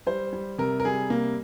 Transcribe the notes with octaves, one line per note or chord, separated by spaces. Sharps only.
G3 C5
G3
C3 A#4
A#4
G3 G#4
C3 A#3